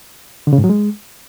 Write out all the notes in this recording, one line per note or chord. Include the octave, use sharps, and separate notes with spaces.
D3
C#3
G#2
F#3
G#3